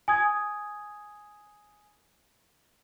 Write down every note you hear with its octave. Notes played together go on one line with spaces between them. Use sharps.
G#5 D#6 G#6